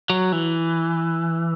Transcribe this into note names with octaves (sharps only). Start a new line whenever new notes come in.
F#3
E3